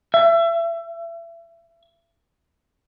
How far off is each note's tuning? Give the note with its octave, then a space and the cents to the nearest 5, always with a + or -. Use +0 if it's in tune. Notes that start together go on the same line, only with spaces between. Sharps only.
E5 +30